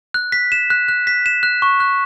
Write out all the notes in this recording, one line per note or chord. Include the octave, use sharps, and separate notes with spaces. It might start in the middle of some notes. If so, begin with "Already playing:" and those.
F#6
B6
E7
F#6
F#6
B6
E7
F#6
C#6
F#6